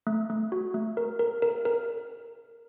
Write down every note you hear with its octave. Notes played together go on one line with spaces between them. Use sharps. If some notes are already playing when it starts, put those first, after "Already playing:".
A3
A3
F#4
A3
A#4
A#4
A#4
A#4